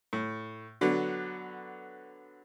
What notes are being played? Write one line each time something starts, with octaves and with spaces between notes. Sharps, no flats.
A2
D3 F#3 B3